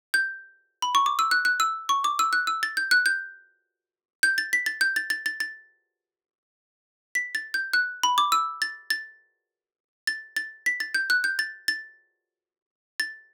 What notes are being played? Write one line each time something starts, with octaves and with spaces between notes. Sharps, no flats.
G6
B5
C#6
D6
E6
F#6
F#6
E6
C#6
D6
E6
F#6
E6
A6
G6
F#6
G6
G6
A6
B6
A6
G6
A6
A6
A6
A6
B6
A6
G6
F#6
B5
D6
E6
A6
A6
A6
A6
B6
A6
G6
F#6
G6
A6
A6
A6